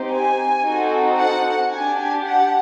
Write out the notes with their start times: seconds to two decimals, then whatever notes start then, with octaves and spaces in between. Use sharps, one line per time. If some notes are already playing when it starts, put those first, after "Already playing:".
Already playing: C4 D#4 G4
0.11 G#5
0.65 C4 D#4 F#4 A4
1.17 F#5
1.70 D4 G4 G#5
2.24 F#5